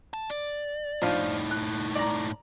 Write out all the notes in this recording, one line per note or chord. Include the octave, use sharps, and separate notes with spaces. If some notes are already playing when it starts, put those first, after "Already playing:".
A5
D5
A2 F3 D4 D#4 F4
F#6
D5 A#5